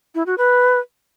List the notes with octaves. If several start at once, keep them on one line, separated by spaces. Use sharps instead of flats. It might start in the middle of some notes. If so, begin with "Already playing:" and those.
E4
F#4
B4